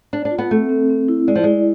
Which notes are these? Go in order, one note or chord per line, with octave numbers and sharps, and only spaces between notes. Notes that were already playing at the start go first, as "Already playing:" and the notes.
D4 D5
D4
F4
B3
A3 C4
C4
C4
E4
G#3 D5
F3
G#3 E4